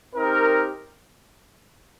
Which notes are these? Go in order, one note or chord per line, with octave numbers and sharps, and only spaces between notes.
C4 D#4 G4 A#4